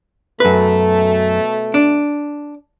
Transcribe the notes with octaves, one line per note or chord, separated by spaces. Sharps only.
F#2 B2 A3 B4
D4